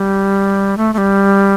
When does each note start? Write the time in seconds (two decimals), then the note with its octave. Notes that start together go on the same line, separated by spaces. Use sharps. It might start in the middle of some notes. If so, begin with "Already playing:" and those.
Already playing: G3
0.77 A3
0.94 A3
0.98 G3